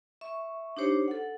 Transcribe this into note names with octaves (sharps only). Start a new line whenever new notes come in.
E5 C#6
D4 D#4 G4 C5 C#5
A4 F#5